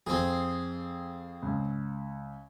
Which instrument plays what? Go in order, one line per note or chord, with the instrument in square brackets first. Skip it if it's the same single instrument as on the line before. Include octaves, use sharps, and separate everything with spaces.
[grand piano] F2 [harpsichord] C4 G#4
[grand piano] C#2